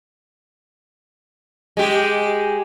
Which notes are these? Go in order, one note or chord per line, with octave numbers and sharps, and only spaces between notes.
G#3 G4